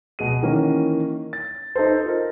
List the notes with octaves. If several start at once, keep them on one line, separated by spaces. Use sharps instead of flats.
B2 G#4 D#7
D#3 E3 A#3 C#4 A#4
A6
D#4 A4 C5
F4 A#4